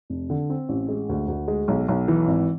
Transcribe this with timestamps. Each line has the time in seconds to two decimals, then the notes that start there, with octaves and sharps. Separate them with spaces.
0.10 F1
0.30 D3
0.50 C4
0.69 A1
0.89 G#3
1.09 D2
1.28 D2
1.48 G#3
1.68 B1
1.88 B1
2.08 E3
2.27 G#1